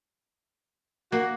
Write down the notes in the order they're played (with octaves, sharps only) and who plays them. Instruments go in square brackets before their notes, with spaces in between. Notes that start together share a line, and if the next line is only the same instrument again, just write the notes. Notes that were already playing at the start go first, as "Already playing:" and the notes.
[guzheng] A#3 [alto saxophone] F#4